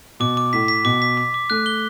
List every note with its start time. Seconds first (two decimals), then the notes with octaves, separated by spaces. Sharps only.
0.20 B2 D6
0.37 D6
0.53 A2 B6
0.68 B6
0.85 B2 D6
1.02 B6
1.17 D6
1.34 D6
1.50 A3 F#6
1.66 G7